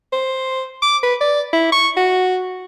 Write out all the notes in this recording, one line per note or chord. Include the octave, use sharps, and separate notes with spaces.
C5
D6
B4
D5
E4
C#6
F#4